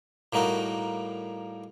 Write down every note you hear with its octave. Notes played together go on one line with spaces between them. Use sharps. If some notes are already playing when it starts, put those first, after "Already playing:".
A2 G3 A#3 D#4 F#4